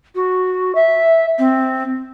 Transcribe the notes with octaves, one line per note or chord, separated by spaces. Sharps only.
F#4
E5
C4